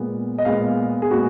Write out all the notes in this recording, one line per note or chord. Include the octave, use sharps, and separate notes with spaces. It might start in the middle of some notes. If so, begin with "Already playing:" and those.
Already playing: A#2 G#3 B3
D#5
A#2 G#3 B3 F5
G#4
A#2 G#3 B3 F#4